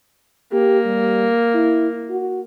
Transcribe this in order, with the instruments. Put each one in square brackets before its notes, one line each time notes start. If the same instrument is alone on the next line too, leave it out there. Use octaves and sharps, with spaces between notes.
[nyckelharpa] A#3 [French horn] G4
[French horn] G3
E4
F#4